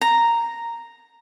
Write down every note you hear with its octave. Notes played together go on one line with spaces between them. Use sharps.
A#5